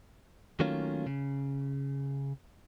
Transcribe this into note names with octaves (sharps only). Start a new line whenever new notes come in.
D#3 F#3 A3 A#3 C#4 F4
C#3